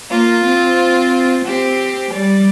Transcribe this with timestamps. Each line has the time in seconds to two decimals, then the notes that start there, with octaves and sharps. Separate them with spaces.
0.10 A#3 F4
0.45 C4
1.45 C4 G4
2.12 G3 D5